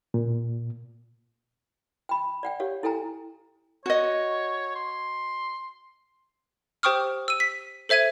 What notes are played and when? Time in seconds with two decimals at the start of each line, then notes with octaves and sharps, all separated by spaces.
0.14 A#2
2.09 G5 B5
2.43 D5 F#5 G5
2.60 G4 C#5 F5
2.83 E4 A4 G5 G#5 A#5
3.86 F#4 C#5 D#5
4.75 C6
6.83 G4 C5 G5 C#6 D#6 F6
7.28 E6 D#7
7.40 B6
7.89 A4 C5 E5 G#6 D#7